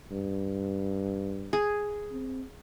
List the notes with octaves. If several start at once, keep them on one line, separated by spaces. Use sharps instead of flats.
G2
G#4
C4